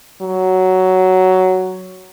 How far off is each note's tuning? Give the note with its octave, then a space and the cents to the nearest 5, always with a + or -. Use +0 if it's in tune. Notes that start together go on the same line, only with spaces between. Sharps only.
F#3 +10